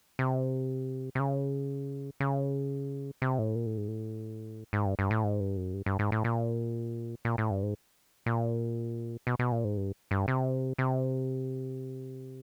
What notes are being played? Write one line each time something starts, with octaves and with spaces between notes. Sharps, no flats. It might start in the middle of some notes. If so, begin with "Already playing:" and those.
C3
C3
C#3
C#3
C3
A2
A#2
A2
G#2
A2
G#2
G2
G2
A2
G#2
G2
F#2
G2
G2
G#2
A2
A#2
A#2
A2
G2
G#2
A#2
B2
B2
A#2
G#2
G2
G2
C3
C3